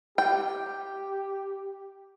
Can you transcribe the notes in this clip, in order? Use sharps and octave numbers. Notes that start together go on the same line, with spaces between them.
G4 G5